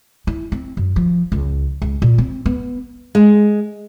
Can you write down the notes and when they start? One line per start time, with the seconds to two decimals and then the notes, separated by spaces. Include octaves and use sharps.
0.27 E4
0.52 C4
0.77 F#2
0.96 F3
1.32 C#2
1.82 C#2
2.02 A#2
2.18 C4
2.46 B3
3.15 G#3